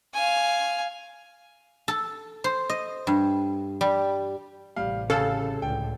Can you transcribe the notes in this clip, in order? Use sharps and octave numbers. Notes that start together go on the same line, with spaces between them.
F5 G#5
A4
C5
D#5
G2
G3
A1 C3 G3 F5
C#3 A4 F5
C#2 A2 D3 G5